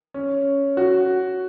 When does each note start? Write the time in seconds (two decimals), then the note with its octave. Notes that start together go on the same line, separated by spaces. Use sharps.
0.14 C#4
0.77 F#4